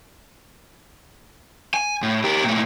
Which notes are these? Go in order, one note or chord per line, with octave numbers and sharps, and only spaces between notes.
G#5
A2
G4 A#4
A#2 A3